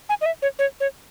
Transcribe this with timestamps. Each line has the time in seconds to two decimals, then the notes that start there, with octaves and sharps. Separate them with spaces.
0.09 G#5
0.21 D#5
0.26 E5
0.42 C#5
0.59 C#5
0.80 C#5